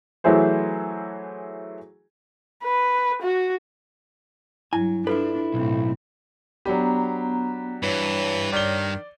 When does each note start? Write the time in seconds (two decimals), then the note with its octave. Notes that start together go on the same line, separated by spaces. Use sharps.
0.24 E3 F#3 A3 E4 G#4 C5
2.63 B4
3.22 F#4
4.73 G2 F#3 E4 G#5
5.07 D4 E4 F4 A4 B4
5.54 B1 A2 C4
6.65 F#3 B3 D4 G4 A#5
7.83 G2 E3 C#5
8.52 D#3 D5 G7